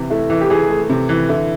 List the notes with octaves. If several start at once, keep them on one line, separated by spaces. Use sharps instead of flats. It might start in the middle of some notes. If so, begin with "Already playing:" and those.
Already playing: C3 E3
A3 E4
E3
G4
E3 G#4
A3
C3
E3
D3 E4